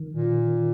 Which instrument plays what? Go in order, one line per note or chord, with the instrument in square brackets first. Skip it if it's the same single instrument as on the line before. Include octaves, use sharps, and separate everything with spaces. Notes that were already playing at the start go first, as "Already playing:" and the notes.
Already playing: [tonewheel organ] D#3
[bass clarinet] A#2